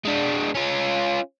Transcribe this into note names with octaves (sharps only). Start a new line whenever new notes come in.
G#3 D4
C#4 F4